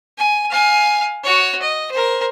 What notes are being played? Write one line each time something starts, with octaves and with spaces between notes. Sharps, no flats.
G#5
F5 G#5
F#4 C#5
D#5
A#4 C5